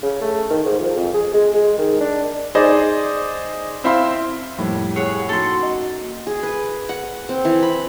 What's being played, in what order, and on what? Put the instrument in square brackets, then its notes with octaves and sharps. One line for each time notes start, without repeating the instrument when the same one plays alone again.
[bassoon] C#3
A3
D#3
G#2
F3
F2
G#4
G#3
G#3
D#3
D4
[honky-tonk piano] D#4 G#4 C5 D5 D#5
C4 E4 F5 C6
[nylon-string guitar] F2 G3 A#3 [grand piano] A2
[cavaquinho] G#4 C#5 F#5
[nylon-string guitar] A#3 C#4 D#4 [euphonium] F#4 [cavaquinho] A4 C6
[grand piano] D#5
[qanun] G#4
B4
F#5
C4
E3
B5